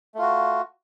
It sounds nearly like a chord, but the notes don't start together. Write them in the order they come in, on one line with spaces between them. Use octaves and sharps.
A3 F4 F#4